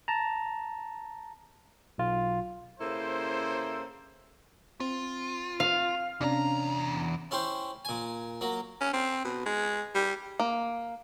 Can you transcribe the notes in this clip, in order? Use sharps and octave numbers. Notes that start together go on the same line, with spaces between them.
A5 A#5
B1 F4
C#3 A#3 E4 A4 C5
C4 F4
F5
E2 C3 C#4 D4 A#5
C#4 E4 G4 C5
A#2 G#5
F#3 A#3
C#4
C4
B2
G#3
G3
A#3